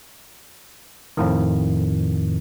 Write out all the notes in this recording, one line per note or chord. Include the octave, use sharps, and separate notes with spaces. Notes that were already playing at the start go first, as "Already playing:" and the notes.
F2 A2 D#3